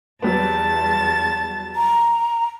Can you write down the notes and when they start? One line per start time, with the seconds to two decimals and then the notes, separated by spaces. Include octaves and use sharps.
0.22 E2 F#3 G3 B3 A5 A6
1.76 A#5